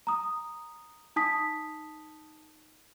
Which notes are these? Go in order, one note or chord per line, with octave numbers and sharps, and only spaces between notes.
A#5 D#6
D#4 A5 D#6 B6